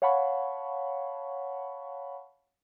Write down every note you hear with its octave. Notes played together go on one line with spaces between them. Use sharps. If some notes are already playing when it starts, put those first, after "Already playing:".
C#5 F5 F#5 A5 B5 C#6